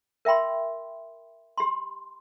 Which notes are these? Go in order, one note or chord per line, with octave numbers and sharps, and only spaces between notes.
A#4 E5 G5 B5 C6
G4 B5 C6